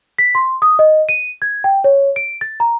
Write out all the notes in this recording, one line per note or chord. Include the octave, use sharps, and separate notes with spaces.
B6
C6
D#6
D#5
D#7
G#6
G5
C#5
D7
A6
A#5